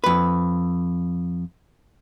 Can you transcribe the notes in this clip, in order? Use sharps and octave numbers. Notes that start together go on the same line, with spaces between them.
F2 B4